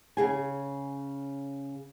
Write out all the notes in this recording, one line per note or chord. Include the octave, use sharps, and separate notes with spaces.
C#3 G#4 G#5